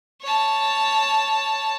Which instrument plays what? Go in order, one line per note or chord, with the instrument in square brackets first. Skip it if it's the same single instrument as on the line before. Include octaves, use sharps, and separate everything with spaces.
[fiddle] C#5 A5